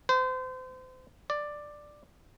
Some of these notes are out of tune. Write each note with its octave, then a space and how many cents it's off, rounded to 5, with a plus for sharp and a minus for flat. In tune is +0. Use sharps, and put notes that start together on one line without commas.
C5 -35
D5 +10